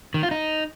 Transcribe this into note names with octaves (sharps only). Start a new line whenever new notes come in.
D#3
F4
D#4